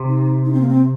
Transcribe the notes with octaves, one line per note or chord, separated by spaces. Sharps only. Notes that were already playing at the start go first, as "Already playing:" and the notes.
Already playing: C3
D#4
D#4
C4
A#3
C4